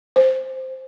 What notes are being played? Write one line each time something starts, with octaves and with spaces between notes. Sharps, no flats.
C5